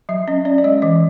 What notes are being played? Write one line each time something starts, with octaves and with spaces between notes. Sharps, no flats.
F#3 E5
C#4 D#5
C#4 D5
D5
G#3 D#5
E3 D#5